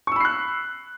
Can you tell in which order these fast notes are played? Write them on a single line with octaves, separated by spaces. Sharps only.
C#6 E6 B5 C7 F#6